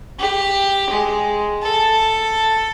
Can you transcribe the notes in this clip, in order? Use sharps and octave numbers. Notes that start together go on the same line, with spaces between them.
G4
G#3
A4